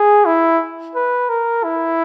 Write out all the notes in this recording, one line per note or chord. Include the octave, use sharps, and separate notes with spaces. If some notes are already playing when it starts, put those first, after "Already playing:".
Already playing: G#4
E4
B4
A#4
E4